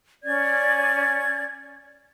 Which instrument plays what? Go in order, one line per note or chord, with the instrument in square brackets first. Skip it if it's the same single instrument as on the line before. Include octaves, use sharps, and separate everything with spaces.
[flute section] C#4 D5 G#6